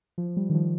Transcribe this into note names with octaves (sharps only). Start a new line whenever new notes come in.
F3
G3
D#3
F3